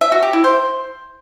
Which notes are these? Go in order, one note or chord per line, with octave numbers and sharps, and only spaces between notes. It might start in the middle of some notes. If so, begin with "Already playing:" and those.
E5
F#4
G4
E4
C5